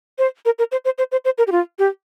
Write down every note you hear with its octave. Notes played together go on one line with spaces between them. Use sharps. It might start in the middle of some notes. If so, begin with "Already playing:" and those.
C5
A#4
A#4
C5
C5
C5
C5
C5
A#4
G4
F4
G4